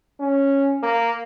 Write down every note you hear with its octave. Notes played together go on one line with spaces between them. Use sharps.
C#4
A#3